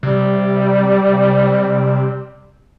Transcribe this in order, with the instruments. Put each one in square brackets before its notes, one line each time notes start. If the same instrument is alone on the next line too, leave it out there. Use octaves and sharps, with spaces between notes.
[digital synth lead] C3 [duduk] G3